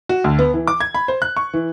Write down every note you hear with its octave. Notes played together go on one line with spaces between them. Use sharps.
F#4
D2
B3
E3
D6
G#6
B5
C5
F#6
C#6
E3